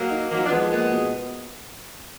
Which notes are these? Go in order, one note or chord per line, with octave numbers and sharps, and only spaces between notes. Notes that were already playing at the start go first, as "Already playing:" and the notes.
Already playing: F#3 A#3
D#4
F3 F#3 A#3
D4
F3 G#3 B3
G#3 A#3 B3
B2